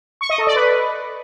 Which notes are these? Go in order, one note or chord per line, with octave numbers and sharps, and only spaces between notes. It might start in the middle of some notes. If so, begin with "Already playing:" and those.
C#6
D#5
A4
D5
B4